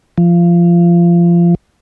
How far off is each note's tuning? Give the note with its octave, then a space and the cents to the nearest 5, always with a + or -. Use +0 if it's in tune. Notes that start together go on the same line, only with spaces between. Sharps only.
F3 -20